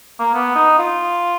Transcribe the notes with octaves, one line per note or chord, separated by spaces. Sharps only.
A#3
B3
D#4
F4